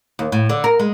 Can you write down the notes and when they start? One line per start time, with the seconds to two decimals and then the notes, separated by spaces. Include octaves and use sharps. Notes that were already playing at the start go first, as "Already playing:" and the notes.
0.19 D#2
0.32 A2
0.50 D3
0.64 A#4
0.79 G#3